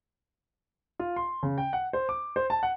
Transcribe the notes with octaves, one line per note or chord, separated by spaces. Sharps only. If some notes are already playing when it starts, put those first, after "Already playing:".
F4
C6
C#3
G5
F#5
C5
D6
C5
A5
F#5